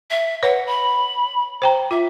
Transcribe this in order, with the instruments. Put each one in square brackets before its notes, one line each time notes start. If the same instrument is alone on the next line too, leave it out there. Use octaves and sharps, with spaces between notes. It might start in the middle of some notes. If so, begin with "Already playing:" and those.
[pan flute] E5
[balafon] B4 C#5 [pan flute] F#5
[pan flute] B5
[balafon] C5 G5 A#5
[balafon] F4 [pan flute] E5